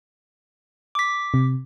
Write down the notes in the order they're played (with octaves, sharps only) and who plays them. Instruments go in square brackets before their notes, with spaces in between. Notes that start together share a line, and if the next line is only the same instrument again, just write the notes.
[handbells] D6 B6
[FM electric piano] C3